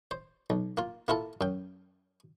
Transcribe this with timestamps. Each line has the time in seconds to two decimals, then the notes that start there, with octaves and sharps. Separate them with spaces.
0.11 C5
0.50 B1
0.77 A#3 F4
1.08 A#3 E4 F4 A4
1.41 F#2 G5